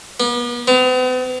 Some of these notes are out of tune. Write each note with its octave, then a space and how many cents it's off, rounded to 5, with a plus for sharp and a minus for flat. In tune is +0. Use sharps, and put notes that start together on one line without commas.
B3 -40
B3 +45